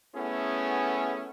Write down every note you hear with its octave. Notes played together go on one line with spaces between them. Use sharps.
A3 B3 C#4 E4 G#4